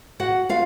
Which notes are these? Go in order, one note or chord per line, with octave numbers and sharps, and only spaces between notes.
F#4 F#5
F4 F5